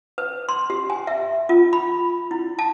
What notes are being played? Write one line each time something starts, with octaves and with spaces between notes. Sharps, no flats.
B4
C6
G4
G#5
E5
F4
B5
E4
A5